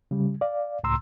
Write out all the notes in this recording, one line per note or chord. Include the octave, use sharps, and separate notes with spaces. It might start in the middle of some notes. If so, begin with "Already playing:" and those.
C#3 G3
D5 F5
C#2 A2 A#5 C6 E6